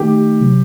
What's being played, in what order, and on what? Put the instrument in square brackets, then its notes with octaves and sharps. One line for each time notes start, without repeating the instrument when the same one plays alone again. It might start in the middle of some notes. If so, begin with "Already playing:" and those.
Already playing: [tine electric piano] D#3 A3 D#4 [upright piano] G4
[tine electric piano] C3 F#3